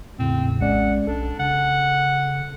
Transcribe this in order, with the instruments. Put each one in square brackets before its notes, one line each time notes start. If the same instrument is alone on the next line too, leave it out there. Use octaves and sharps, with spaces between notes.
[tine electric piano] E2 A2 C#3 [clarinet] C4
[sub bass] A#1 [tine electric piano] G#3 C#4 D5 [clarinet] F#5
[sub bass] B1 [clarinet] D4 [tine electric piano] A4
[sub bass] C#3 [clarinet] F#5